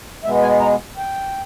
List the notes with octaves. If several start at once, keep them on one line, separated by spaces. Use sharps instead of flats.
B2 G#3 B3 E5
G#5
A#5
G5